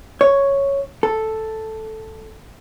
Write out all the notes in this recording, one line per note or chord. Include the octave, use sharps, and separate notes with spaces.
C#5
A4